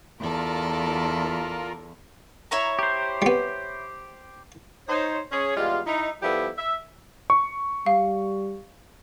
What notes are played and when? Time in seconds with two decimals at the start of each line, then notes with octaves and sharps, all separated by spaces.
0.20 E2 F4 A4 A#4 D5
2.51 E4 C#5 A#5
2.79 G4 C5
3.22 G3 B3
4.88 D#4 C5 C#5
5.32 C#4 G#4 C#5
5.56 E2 G3 G#3 F4
5.86 D#4 E4
6.22 F3 G3 B3 E4 G4 A4
6.58 E5
7.30 C#6
7.86 G3 F5